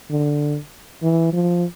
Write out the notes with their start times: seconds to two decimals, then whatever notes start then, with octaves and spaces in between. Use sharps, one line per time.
0.10 D3
1.02 E3
1.33 F3